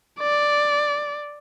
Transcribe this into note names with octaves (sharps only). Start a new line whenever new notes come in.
D5